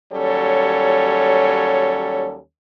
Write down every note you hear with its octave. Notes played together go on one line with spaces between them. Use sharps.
D#2 F#3 G3 C#4 A4 C#5